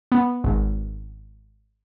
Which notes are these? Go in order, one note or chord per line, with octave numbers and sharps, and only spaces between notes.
B3
G#1